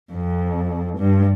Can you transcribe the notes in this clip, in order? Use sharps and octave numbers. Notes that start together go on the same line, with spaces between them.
F2
G2